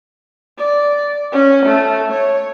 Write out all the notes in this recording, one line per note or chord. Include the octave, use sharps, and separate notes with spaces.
D5
C#4
A3
C#5